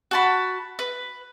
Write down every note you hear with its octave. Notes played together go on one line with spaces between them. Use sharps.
F#4 A5 B5
B4